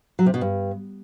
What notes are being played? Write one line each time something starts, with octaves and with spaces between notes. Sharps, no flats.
F#3
C3
B2
G2